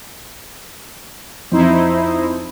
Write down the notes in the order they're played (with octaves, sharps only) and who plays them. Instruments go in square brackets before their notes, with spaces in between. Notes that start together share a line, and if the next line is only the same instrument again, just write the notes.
[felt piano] F2 [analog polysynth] D#4 E4 C5